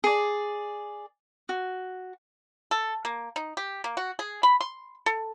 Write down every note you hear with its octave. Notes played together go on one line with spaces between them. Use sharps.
G#4 D5
F#4
A4
A#3
D#4
G4
A#3
F#4
G#4
B5
C6
A4